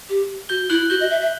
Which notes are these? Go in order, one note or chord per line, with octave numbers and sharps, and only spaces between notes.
G4
F#4 G6 G7
E4 F#6 F#7
F#4 G6 G7
D#5
E5
E5